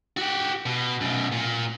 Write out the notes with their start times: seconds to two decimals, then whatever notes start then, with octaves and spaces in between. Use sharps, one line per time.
0.17 F#4 G4
0.66 B2
1.01 F#2 B2
1.32 A#2